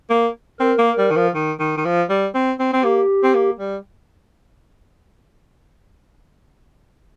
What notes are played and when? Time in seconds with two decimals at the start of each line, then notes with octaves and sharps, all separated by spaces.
0.10 A#3
0.60 C4 A#4
0.78 A#3
0.98 G3
1.10 D#3
1.16 F3
1.35 D#3
1.59 D#3
1.77 D#3
1.85 F3
2.10 G3
2.34 C4
2.59 C4
2.73 C4
2.83 A#3 G4
3.23 C4
3.34 A#3
3.59 G3